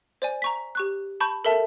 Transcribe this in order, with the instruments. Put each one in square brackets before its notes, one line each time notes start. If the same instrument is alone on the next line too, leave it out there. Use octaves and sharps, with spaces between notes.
[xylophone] C5 D5 G#5
A#5 C#6 B6
G4 C#6 F#6
A5 B5 C#6 G6
A4 A#4 E5 A5